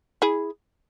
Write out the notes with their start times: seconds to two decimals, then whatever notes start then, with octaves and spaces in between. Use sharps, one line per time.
0.22 E4 G#4